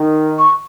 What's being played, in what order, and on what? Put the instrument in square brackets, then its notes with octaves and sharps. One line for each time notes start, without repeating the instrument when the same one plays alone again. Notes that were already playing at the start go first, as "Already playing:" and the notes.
Already playing: [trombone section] D#3
[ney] C#6